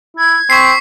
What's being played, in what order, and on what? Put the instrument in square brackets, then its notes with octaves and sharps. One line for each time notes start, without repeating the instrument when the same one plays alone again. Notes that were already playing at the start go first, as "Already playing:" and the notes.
[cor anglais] E4 [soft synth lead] G#6
[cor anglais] C4 [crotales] C#6 B6 C7